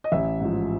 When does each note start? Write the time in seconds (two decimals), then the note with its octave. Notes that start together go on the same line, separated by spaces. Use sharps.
0.04 D#5
0.12 A1 E5
0.41 G#2 F3